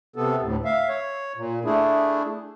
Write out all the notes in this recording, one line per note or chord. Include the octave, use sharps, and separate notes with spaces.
C3 B3 A4
D2 A2
E5 F5
C#5
A#2
A3 D4 E4 G#4